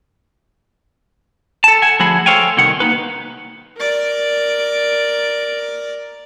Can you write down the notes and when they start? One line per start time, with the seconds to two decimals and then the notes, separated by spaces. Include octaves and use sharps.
1.64 A4 A5
1.82 F#5 G#5
1.99 D3 F3 A3 F#4 G#4 B5
2.26 A4 C5 C#5 F5 G5 G#5
2.57 C2 B2 D#3 F#5
2.80 A#3 D#4 B4
3.77 A#4 D5